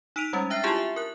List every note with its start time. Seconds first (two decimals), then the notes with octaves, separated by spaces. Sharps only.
0.16 D#4 E6 B6 D7 D#7 F7
0.33 G3 G#3 C#4
0.50 D4 E5 F#6 A6 C7
0.63 E4 F4 G4 G#4 G#5 A5
0.76 E5
0.96 A#4 F#6